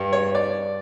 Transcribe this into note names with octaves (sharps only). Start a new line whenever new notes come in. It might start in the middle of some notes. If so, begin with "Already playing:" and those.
Already playing: G2
C#5
D5